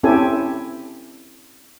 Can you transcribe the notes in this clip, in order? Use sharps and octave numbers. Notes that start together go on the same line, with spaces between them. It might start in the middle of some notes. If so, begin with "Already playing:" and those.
C4 C#4 E4 G4 A4 G#5